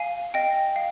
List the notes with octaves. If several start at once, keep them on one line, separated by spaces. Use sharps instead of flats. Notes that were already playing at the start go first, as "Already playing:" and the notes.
Already playing: F5 G#5
D#5 G5
F5